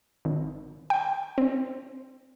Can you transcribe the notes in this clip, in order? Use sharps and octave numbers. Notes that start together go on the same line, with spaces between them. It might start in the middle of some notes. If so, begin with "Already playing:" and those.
G#1
G5
C4